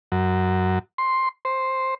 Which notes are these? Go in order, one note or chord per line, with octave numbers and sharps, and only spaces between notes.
F#2
C6
C5